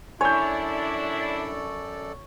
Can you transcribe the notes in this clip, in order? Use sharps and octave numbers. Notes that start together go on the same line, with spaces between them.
F#2 D4 E4 A4 C#5 D5 G#5 G6